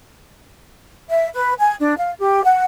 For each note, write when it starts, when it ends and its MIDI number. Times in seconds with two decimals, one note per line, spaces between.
1.09 1.27 76
1.33 1.53 71
1.58 1.75 80
1.79 1.94 62
1.97 2.11 77
2.19 2.43 67
2.44 2.64 78